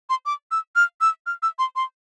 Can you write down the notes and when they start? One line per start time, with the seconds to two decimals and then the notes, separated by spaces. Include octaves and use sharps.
0.10 C6
0.26 D6
0.51 E6
0.76 F6
1.01 E6
1.26 F6
1.43 E6
1.59 C6
1.76 C6